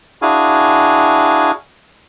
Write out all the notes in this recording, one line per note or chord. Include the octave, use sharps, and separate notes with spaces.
D4 E4 F#4 G#4 F5 G#5